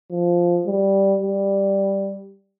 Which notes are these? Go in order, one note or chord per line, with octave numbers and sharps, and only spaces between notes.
F3
G3
G3